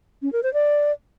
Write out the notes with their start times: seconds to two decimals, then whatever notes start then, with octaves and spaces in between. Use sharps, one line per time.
0.22 C#4
0.33 A#4
0.43 C5
0.53 D5